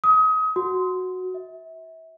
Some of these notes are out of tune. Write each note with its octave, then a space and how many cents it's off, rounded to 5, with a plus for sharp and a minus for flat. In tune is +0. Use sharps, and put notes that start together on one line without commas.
D#6 +30
F#4 -5
E5 -25